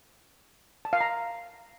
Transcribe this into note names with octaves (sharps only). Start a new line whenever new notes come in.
A5
F5
A#5